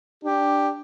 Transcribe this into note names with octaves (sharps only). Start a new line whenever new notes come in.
D4 G4